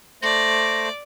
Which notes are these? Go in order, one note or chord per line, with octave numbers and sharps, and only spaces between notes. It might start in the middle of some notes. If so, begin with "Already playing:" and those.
A3 C5 D5 A#6